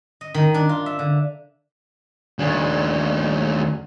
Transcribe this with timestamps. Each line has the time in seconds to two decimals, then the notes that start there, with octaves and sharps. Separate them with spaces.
0.21 D#5
0.34 D#3
0.54 D4
0.69 F4
0.86 E5
0.99 D3
2.39 D#2 D4